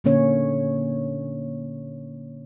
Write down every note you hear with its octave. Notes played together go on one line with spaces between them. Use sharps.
A#2 D3 A#3 C#4 C#5